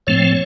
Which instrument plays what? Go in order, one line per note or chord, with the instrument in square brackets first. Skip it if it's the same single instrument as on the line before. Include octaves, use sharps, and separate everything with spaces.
[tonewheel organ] A2 F3 A3 C4 C#5